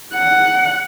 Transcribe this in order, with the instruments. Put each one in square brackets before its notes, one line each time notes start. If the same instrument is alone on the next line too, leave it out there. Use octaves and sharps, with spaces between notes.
[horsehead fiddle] F#5